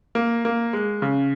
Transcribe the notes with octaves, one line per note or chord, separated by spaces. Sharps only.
A#3
A#3
G#3
C#3